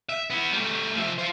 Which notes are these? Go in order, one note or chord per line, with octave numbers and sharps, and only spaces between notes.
E5
B3 E4
G3 A3
F3 E5
F4 C5